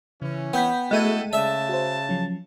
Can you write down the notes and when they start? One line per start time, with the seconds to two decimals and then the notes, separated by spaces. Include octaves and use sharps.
0.22 C#3 E3 C#4
0.53 B3 G5 G6 B6
0.91 G#3 A3 E4 F#4 A4 D#7
1.33 C#3 D5 E5 A5
1.69 F#4 C5
2.09 F3 F#3 C#4